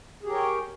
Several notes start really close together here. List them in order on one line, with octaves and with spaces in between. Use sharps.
G#4 G4 A#4 C#5 G5